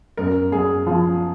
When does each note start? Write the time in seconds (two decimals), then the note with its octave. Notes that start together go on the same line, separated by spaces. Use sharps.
0.17 F#2 A#4
0.52 F#2 G#4
0.87 F3